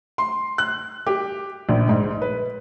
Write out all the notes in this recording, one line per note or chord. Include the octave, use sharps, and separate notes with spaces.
C6
F#6
G4
A#1
G#2
B4